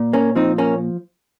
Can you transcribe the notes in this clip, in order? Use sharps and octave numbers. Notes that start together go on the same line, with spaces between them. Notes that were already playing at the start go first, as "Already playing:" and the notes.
Already playing: A#2
A#3 C#4
F3 C4 D#4
A#3 C#4